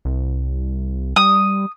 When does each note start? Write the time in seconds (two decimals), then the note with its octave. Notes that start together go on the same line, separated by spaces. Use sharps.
0.05 C2
1.16 G3 D#6